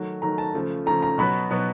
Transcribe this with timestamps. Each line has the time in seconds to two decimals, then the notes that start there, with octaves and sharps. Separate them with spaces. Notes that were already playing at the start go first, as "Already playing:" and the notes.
Already playing: D#3 F#3 A3
0.22 D#3 F#3 A3 A#5
0.38 A5
0.54 C#3 F3 A3
0.86 C#3 F3 A3 A#5
1.03 A#5
1.18 B2 F#3 B3 B5
1.50 B2 F#3 B3